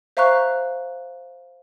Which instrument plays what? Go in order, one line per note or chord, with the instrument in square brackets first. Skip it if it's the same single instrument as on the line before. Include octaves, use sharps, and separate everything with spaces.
[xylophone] C5 E5 F5 A#5 C#6 F#6